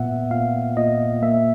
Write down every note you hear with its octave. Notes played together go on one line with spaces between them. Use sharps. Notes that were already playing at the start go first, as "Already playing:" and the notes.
Already playing: A#2 B3 E5 F#5
A#2 F5
A#2 D#5
A#3 E5